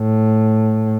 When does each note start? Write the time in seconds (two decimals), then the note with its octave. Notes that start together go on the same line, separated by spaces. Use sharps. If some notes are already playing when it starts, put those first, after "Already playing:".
Already playing: A2